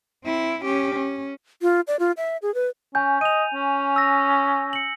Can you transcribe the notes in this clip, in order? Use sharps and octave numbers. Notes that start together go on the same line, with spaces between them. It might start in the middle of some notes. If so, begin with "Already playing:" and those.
C4 E4
C#4 G4
C#4
F4
D5
F4
E5
G#4
B4
C#4 G#5 G6
D#5 D#7 F7
C#4
E6 A#6
C#7 F#7